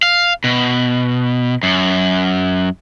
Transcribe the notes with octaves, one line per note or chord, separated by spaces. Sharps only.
F5
B2
F#2